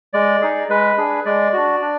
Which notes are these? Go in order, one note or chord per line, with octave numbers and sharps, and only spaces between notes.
G#3 D5
D#4 G#4
G#3 B4
D4 G#4
G#3 D5
D4 F#4
D4